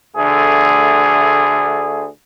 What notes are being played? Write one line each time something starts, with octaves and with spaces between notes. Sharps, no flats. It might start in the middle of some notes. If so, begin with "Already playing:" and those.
D2 D3 A3 G#4